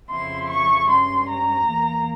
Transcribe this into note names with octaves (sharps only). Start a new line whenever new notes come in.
F2 C#3 F3 C4 E4 C6
C#6
G2 G3 C#4 C6
A#5
E2 E3 A#3